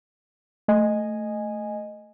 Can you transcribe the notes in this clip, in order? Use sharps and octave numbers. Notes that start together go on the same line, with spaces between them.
A3 D#5 G#5